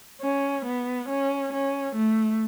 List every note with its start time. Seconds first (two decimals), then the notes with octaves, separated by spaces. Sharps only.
0.21 C#4
0.65 B3
1.09 C#4
1.53 C#4
1.95 A3